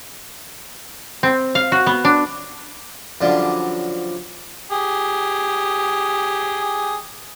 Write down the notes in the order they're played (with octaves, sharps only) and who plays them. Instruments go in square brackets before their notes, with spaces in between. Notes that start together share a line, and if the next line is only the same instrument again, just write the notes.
[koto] C4
F5
F#4
B3
D4
[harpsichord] F#2 D3 F3 G3
[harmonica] G4 G#4